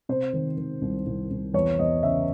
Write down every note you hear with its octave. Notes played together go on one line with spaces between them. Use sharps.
C3 C5
D#3
D#3
C2
C2
C2
E2 C#5
E2 D#5
C#3 E5